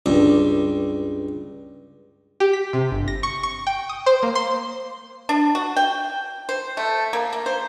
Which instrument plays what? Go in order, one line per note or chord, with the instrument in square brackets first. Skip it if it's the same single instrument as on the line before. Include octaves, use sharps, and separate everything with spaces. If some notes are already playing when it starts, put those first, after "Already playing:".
[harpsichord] C#2 G2
[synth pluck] G4
B6
C3
G1
A#6
C#6
C#6
G5
D#6
C5
A#3
C6
[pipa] D4
F#4
G5
C5
A3
A#3
A#3
C5